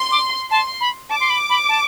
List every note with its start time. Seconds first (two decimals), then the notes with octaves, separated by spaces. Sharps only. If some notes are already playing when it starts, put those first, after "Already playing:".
Already playing: C6
0.12 D6
0.51 A5 C6
0.81 B5
1.10 A5 D6
1.20 C6
1.30 B5
1.50 B5
1.69 A5